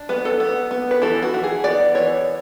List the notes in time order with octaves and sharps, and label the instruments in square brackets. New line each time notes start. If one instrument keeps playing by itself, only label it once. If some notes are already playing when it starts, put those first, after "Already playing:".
Already playing: [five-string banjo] D4
B3 B4
A4
B3
B3
B4
E3 A4
F#4
E3
G#4
B3 D5
E3 C#5